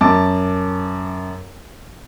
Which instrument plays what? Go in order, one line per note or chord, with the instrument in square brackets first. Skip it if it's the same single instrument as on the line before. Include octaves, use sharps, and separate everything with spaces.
[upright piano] F#2 A5 D6